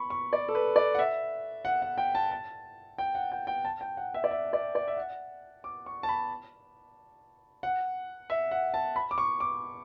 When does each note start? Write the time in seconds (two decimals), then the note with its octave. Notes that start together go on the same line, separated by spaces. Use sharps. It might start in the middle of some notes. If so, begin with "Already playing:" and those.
Already playing: B5 C#6
0.10 C#6
0.33 D5
0.49 A4
0.55 B4
0.76 D5
0.95 F#5
0.99 E5
1.65 F#5
1.82 F#5
1.98 G5
2.15 A5
2.31 A5
2.98 G5
3.15 F#5
3.32 G5
3.47 G5
3.65 A5
3.81 G5
3.97 F#5
4.14 E5
4.24 D5
4.31 E5
4.53 D5
4.75 D5
4.88 E5
4.97 F#5
5.64 D6
5.86 C#6
6.03 A5
6.09 B5
7.63 F#5
8.30 E5
8.51 F#5
8.74 A5
8.96 B5
9.11 D6
9.18 C#6
9.40 D6